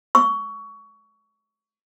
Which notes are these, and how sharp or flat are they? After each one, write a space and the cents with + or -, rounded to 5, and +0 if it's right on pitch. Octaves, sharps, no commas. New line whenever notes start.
C#6 +20 E6 +5